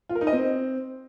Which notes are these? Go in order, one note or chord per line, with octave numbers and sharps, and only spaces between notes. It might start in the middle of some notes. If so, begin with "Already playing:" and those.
F4
A#4
D#4
D#5
C4